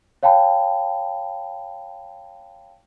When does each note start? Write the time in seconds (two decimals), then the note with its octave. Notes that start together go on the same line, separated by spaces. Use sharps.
0.23 C#5 F5 G5 A5 B5